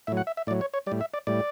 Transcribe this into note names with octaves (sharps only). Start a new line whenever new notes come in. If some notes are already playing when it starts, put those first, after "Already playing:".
A2 F#3 E5
F#5
E5
E5
A2 F#3 D5
C#5
C#5
G3 D5
A2
E5
D5
A2 G3 D5